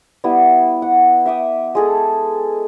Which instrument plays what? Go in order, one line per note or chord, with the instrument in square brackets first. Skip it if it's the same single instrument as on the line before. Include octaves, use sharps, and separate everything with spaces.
[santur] G3 B3 E4
F#5
E5 G5 D6 D#6
G#3 G#4 A4